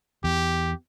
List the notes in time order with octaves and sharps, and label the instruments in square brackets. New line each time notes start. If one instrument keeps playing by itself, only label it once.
[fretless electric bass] E2 [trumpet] G4